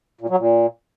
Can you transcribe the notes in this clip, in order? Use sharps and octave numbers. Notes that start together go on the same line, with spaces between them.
A#2
F#3
A#2